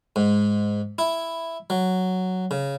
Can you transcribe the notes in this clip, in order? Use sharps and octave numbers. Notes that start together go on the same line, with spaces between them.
G#2
E4
F#3
C#3